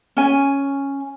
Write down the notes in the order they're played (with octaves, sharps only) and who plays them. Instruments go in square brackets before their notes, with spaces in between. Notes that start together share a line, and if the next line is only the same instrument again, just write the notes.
[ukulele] C#4 G#5